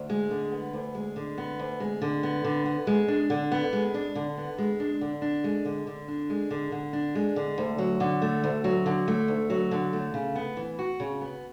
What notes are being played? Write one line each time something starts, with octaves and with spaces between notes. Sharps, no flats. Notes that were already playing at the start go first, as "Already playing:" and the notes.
Already playing: D2
G#3
D3
B3
D2
G#3
D3
B3
D2
G#3
D3
B3
D3
B3
G#3
D4
D3
B3
G#3
D4
D3
B3
G#3
D4
D3
D4
G#3
D3
D3
D4
G#3
D3
D3
D4
G#3
D3
D2
F#3
D3
A3
D2
F#3
D3
A3
D2
F#3
D3
A3
C#3
B3
E3
F#4
C#3
B3